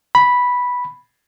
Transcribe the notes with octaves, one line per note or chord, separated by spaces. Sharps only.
B5